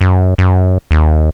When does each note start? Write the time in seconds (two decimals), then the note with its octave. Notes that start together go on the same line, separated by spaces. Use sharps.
0.01 F#2
0.38 F#2
0.91 D#2